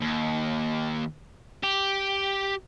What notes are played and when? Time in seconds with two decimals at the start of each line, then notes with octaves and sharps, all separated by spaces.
0.01 D#2
1.63 G4